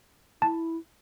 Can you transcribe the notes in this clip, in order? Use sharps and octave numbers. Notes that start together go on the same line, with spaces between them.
E4 A5